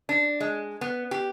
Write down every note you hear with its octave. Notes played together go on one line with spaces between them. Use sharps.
D4
G#3
B3
G4